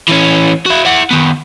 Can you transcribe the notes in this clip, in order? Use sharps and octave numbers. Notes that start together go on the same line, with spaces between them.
E3 C#4
E4 F#4
E4 F#5
D#3 B3